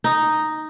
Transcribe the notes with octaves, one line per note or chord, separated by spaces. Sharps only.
D#4